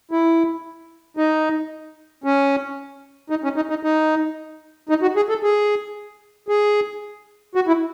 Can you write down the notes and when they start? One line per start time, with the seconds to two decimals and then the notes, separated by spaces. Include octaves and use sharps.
0.11 E4
1.17 D#4
2.24 C#4
3.30 D#4
3.44 C#4
3.56 D#4
3.70 D#4
3.83 D#4
4.89 D#4
5.02 F#4
5.16 G#4
5.29 A4
5.43 G#4
6.48 G#4
7.55 F#4
7.67 E4